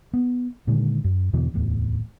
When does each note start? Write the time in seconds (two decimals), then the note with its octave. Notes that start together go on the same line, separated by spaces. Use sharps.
0.14 B3
0.67 A#2 D3 D#3 G#3
1.04 F#2
1.33 E2 B2 D3 E3
1.54 D1 E2 A2